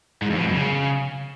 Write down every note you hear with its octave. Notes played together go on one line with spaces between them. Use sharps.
G#2
F2
B2
F#2
C#3